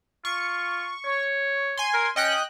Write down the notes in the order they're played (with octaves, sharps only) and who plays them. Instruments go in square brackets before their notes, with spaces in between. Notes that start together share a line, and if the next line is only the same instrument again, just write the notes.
[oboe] F4 [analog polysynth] C#6
[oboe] C#5
[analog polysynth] G#5 C6
[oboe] A#4
[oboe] C#4 [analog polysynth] D#5 G5 F#6